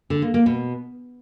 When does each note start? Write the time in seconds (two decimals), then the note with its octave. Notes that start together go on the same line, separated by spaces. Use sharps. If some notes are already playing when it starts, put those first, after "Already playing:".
0.10 D3
0.22 A#3
0.34 A#3
0.46 B2